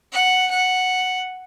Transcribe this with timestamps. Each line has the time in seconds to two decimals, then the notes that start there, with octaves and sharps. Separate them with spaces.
0.12 F#5
0.51 F#5